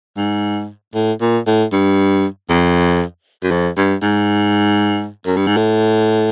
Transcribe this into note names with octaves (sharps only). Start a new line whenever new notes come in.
G#2
A2
A#2
A2
G2
F2
F#2
F2
G2
G#2
F#2
G2
G#2
A2